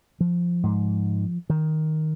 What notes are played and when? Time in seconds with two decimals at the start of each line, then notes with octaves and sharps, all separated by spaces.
0.20 F3
0.63 G#2
1.50 D#3